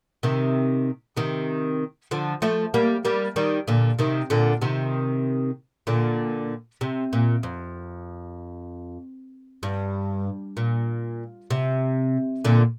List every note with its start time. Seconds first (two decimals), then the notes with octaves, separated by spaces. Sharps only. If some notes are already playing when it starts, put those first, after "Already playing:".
0.23 C3 D#3
1.17 C3 D#3
2.11 D3 F3
2.42 F3 A3
2.74 G3 A#3
3.05 G3 A#3
3.36 D#3 G3
3.68 A#2 D3
3.99 C3 D#3
4.30 A#2 D3
4.62 C3 D#3
5.87 A#2 D3
6.81 C3
7.13 A#2
7.43 F2
9.63 G2
10.57 A#2
11.50 C3
12.44 A#2 D3